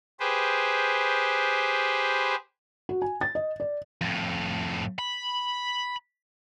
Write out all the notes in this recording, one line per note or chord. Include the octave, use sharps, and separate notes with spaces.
G4 G#4 B4 C5
F#4
G#5
A6
D#5
D5
F2 A2
B5